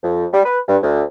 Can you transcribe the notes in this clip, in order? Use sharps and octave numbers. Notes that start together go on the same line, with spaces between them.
F2
G3
B4
G2
D2